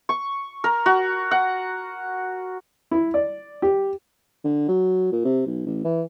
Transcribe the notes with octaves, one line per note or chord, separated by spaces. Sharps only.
C#6
A#4
F#4
F#5
E4
D5
G4
D3
F#3
A#2
C3
B1
A1
E3